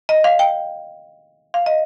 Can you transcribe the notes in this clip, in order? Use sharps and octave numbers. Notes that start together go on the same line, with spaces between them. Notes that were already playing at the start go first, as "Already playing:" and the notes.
D#5
F5
G5
F5
D#5